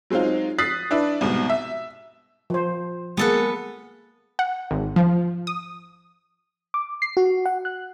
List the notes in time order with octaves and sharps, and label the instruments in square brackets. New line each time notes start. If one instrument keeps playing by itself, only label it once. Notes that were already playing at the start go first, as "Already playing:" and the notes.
[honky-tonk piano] F#3 G#3 C4 D#4 F4
D#6 F#6 A6 B6 C7
D4 E4 B4
C2 G#2 B2
E5
[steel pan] F3 C5
[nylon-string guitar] G#3 A#3 [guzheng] B3 A4 B4
[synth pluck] F#5
G#1
F3
D#6
[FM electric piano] D6
C7
F#4
F#5
F#6